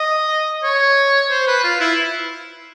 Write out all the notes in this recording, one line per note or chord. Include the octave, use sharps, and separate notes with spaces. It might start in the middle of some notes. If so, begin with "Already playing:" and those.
Already playing: D#5
C#5
C5
B4
F4
E4